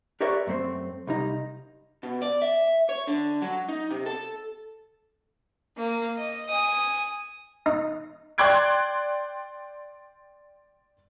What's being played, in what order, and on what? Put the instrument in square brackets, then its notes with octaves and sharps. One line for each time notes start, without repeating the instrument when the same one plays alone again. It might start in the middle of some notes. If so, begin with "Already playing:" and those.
[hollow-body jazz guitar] G4 A#4 B4 C#5 D5 E5
F#2 A3 C4
C2 G3 D#4
[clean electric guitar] B2
D5
E5
C#5
D3
F#3
D#4
C3
A4
[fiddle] A#3
D#5
G#5 D#6
[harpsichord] D#4
[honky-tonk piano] D5 G5 C6 F#6 G#6 D7